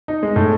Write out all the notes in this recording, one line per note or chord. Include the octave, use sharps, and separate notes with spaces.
D#4
G#3
A2